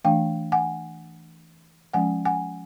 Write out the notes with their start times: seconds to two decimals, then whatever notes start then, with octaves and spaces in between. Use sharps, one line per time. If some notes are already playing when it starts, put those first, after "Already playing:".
0.04 E3 A3 D4 F5 G5
0.52 F#5 G#5
1.93 F3 G#3 C#4 F#5 G#5
2.25 F#5 G#5